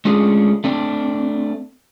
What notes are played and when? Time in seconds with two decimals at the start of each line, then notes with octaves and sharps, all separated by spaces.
0.05 G#3 A3 C#4 D4 F4 G#4
0.64 A3 C4 D4